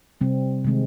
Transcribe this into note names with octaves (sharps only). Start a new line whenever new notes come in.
C3 G3 C4
C3 D#3 G#3 C4